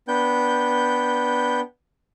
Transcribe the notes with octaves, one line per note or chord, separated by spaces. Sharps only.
B3 D4 G5 G6